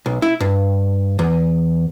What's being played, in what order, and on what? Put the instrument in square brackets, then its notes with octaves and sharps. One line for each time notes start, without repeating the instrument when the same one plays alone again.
[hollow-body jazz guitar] B1
E4
G2
E2